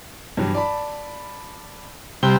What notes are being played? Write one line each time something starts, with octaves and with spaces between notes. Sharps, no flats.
G2 E3 F#3
D5 A5 B5
C3 G3 F#6 G7